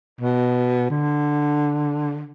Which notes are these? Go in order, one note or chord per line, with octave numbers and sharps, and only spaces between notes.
B2
D3